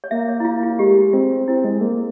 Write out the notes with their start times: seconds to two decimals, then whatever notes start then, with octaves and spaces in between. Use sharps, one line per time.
0.04 C#5
0.11 A#3 E5
0.29 C#5
0.40 E4
0.45 F4
0.63 F4
0.79 G#3 G4
1.13 C4 F4
1.48 C4 E4
1.65 G#3
1.81 A#3